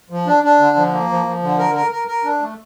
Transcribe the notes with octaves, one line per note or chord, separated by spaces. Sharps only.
F3
D4
D4
D3
F3
A#3
F3
F3
D3
A#4
A#4
A#4
A#4
D4
A3